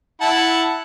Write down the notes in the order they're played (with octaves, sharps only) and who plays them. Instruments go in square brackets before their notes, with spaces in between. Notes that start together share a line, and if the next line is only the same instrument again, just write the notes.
[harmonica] E4 F#5 A5